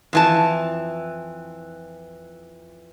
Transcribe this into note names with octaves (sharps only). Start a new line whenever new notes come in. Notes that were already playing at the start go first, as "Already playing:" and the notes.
F2 E3 A5